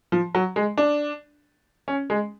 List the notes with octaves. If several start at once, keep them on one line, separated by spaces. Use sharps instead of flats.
F3
F#3
G#3
D4
C#4
G#3